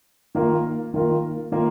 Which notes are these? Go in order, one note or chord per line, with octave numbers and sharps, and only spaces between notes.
D#3 A#3 F4 A#4
D#3 A#3 F4 A#4
D#3 A#3 F4 A#4